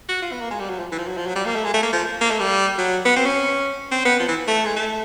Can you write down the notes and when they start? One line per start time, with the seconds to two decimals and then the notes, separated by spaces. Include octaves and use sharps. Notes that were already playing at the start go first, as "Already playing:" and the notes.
0.09 F#4
0.22 F4
0.32 B3
0.41 A#3
0.51 G#3
0.60 G3
0.69 F#3
0.79 F3
0.92 E3
0.98 F3
1.08 F#3
1.17 F3
1.27 F#3
1.36 G3
1.46 A#3
1.55 A3
1.64 G#3
1.74 A3
1.83 A#3
1.93 F3
2.21 A#3
2.30 A3
2.40 G3
2.78 F#3
3.05 B3
3.16 C4
3.25 C#4
3.91 C4
4.05 B3
4.20 F3
4.28 E3
4.47 A3
4.65 G#3
4.76 A3